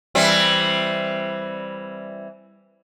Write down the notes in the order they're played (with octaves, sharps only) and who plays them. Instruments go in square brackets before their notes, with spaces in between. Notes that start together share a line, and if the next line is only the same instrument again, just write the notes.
[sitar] E3 G3 C4